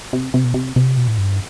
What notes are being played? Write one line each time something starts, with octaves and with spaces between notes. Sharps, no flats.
C3
C3
B2
C3
C3
B2
A2
G2